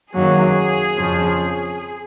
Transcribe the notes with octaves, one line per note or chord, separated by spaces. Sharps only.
F#2 D#3 F#3 A#3 G#4
F2 C#3 F3